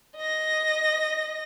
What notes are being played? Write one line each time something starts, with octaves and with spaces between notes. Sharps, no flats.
D#5 A#6